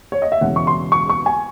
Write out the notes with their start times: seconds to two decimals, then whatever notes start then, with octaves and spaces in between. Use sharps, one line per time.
0.12 C#5
0.22 D#5
0.32 E5
0.41 E1 E2 C#3 F#5
0.56 C#6
0.67 C6
0.92 C#6
1.09 C#6
1.26 G#5